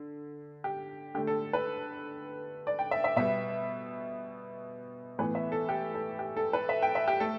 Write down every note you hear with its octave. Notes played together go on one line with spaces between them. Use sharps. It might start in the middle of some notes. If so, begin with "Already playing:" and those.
Already playing: D3
G4
D3 A3 G4
A4
B4
D5
G5
E5
E5
B2 G3 B3 E5
A2 E3 B3 B4
E5
A4
G4
A4
G4
A4
B4
E5
G5
E5
G4
A3 A4